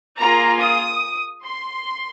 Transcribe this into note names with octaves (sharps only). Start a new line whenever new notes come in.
A#3 F4 G#4 A#5
D#6
C6